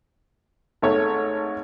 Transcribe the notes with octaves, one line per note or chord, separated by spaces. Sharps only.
G#1 A3 C#5